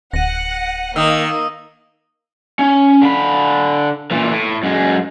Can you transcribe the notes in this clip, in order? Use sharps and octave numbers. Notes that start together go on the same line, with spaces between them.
D1 F#5 A#6 D#7
D#3 A#3 D#6 E6
C#4
D3 B5
A#2 E3
A2
F#2 G#3